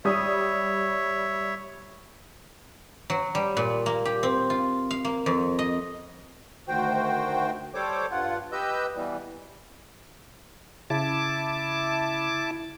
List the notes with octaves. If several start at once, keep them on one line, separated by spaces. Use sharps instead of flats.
G3 C#5 E5 D#6
F#3
G3
A#2
A#3
G4
C4
F4
F5
A#3
F2
D#5
D2 D#3 F#4 C5 G5
G3 A4 C5 C#5 D6
G2 F4 F#5
G4 B4 D#5 E6 G6
B2 E3 G3
C#3 E4 A5 D6